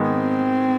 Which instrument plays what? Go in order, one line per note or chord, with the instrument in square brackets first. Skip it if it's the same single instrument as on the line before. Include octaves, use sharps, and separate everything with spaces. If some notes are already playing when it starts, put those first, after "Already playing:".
Already playing: [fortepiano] G#2 D#3 G#3 B3
[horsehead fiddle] C4